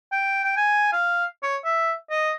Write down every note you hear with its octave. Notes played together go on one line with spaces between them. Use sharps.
G5
G5
G#5
F5
C#5
E5
D#5